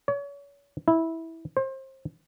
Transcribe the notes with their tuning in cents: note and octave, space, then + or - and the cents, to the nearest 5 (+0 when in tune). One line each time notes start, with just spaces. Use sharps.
C#5 +35
E4 -15
C5 +30